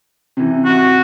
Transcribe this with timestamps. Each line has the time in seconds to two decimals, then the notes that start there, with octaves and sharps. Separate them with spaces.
0.37 C3 E3
0.65 F#4